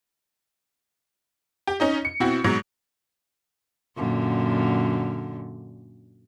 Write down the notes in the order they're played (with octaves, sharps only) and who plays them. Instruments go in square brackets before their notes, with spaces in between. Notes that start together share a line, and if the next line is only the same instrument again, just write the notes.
[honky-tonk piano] G4
C#4 D#4 D#5
C#7
B2 C4 E4 F#4
G#2 B2 F#3
[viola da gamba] F#2 A#2 D3